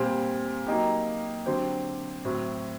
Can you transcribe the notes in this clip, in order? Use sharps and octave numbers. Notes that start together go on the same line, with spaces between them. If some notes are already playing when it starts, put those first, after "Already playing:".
Already playing: A#2 G3 C4
F#3 A#3 D#4 G4
D3 F#3 C4 G4 C5
A2 F#3 C4